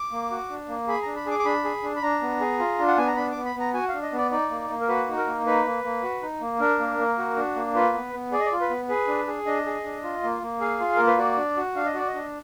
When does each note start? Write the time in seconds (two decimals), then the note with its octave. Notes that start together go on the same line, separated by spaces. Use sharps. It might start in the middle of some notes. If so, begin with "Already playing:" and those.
Already playing: D6
0.12 A#3
0.31 F#4
0.50 D4
0.68 A#3
0.88 G#4 B5
1.02 D4 A#5
1.16 B5
1.26 G#4 D6
1.39 D6
1.45 D4 B5
1.64 G#4
1.83 D4
1.96 B5
2.02 D4 A#5
2.22 B3
2.41 G#4
2.59 F4
2.79 D4
2.87 F#5
2.97 B3 G#5
3.07 A#5
3.16 D4 B5
3.31 B3 D6
3.45 B5
3.55 B3 A#5
3.74 F#4 G#5
3.89 F5
3.94 D4
4.03 D#5
4.13 B3 D5
4.31 D#4 D5
4.50 A#3
4.69 A#3
4.81 A#4
4.88 F#4 B4
5.08 D#4
5.17 A#4
5.27 A#3
5.46 D#4 B4
5.65 A#3
5.84 A#3
6.03 F#4
6.22 D#4
6.41 A#3
6.60 D4 A#4
6.79 A#3
6.98 A#3
7.18 F#4
7.36 D4
7.55 A#3
7.75 F4 B4
7.94 B3
8.13 B3
8.32 G#4 D5
8.40 D#5
8.46 D5
8.52 F4
8.61 B4
8.70 B3
8.89 G#4 B4
9.08 D4
9.27 G#4
9.46 D4 D#5
9.66 G#4
9.84 D4
10.03 F4
10.23 A#3
10.42 A#3
10.60 G#4 F5
10.80 F4
10.96 A#3 A#4
11.07 B4
11.18 F#4 D5
11.37 D4
11.57 F#4
11.76 D4 F5
11.86 D#5
11.95 F#4 D5
12.07 D#5
12.14 D4